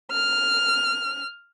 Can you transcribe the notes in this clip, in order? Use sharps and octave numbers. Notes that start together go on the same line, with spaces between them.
F6